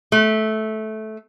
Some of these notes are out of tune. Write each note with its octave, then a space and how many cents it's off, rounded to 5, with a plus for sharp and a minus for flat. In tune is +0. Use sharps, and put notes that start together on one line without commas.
A3 -15